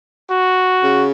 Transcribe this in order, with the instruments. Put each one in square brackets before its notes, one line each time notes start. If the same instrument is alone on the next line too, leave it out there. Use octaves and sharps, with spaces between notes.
[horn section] F#4
C#3